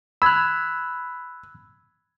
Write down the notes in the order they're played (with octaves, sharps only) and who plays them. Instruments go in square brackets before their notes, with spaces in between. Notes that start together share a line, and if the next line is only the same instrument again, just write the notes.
[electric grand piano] B5 G#6 [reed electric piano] E6 F#6